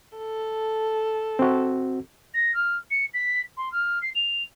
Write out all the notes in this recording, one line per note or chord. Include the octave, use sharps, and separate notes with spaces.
A4
C4 F#4
A#6
F6
C#7
B6
C6
F6
C7
F7